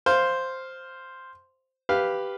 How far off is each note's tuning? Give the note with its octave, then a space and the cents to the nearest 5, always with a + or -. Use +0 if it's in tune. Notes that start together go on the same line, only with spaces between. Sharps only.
C5 +0 F5 +0
G4 +0 B4 +0 F5 +0